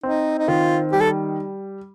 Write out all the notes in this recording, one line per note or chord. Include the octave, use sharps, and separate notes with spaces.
C4 D#4
D#4
D#3 F4
G3 G4
A4